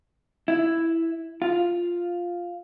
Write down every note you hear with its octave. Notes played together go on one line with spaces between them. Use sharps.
E4
F4